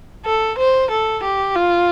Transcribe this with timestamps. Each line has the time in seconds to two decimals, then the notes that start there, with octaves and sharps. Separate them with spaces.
0.26 A4
0.58 C5
0.91 A4
1.24 G4
1.55 F4